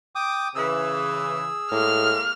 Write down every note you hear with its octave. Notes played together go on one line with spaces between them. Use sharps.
G5 D6 D#6
C#3 E3 G#4 E6
A2 G#3 A#3 F6